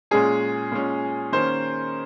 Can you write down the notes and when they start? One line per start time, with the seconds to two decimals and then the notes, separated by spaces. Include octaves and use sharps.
0.11 A#2 G#3 C#4 G#4
0.71 A#2 G#3 C#4
1.32 D#3 A#3 C#4 C5